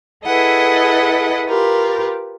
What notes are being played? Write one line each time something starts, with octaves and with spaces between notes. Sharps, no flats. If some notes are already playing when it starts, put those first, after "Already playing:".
E4 G#4 A4 B4 D#5 F#5
F4 G4 A#4 B4